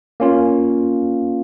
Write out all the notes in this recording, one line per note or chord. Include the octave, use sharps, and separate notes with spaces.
A#3 C#4 F4